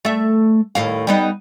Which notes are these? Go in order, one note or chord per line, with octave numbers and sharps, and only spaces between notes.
A3 E5
D#2 A2 F5
G3 B3 D#4